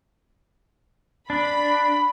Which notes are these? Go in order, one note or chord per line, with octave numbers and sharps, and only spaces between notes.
D4 B5